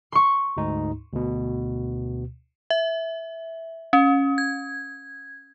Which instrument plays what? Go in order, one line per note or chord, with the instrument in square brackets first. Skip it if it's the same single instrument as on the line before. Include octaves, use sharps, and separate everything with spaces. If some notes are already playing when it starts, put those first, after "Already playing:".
[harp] C6 C#6
[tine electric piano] D2 G#2 D#4
D2 B2
[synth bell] E5
C#4
G#6